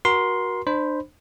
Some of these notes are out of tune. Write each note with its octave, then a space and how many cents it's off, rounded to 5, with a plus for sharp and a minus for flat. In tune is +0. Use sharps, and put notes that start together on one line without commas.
F#4 +0 A#4 +30 C6 +0
D4 +35 C5 +0 B5 +5